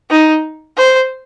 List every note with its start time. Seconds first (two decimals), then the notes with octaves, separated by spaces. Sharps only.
0.10 D#4
0.77 C5